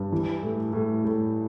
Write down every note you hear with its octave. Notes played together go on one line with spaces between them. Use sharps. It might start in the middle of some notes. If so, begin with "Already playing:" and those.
Already playing: G2
E3
A2
A2
A2